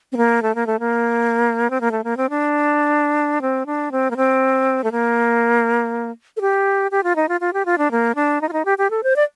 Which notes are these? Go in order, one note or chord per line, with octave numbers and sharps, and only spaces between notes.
C4
A#3
A3
A#3
A3
A#3
C4
A#3
A3
A#3
C4
D4
C4
D4
C4
A#3
C4
A3
A#3
A4
G4
G4
F4
D#4
F4
F4
G4
F4
D4
A#3
D4
D#4
F4
D#4
G4
G4
A4
C5
D5